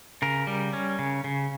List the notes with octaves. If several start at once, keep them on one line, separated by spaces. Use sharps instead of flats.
C#3 A#4
G3
C#4
C#3
C#3